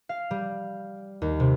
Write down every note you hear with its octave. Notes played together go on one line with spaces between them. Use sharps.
F5
G3
D#2
C3